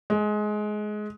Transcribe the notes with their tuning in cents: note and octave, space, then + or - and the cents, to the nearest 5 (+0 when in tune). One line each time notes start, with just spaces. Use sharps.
G#3 +20